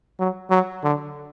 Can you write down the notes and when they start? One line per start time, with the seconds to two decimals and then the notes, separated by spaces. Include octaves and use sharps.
0.20 F#3
0.50 F#3
0.84 D3